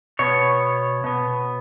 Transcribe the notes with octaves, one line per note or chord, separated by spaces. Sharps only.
B2 B3 C#5
B2 B3